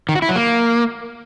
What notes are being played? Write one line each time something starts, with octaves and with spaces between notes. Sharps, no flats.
D#3
F#4
E4
F#3
A#3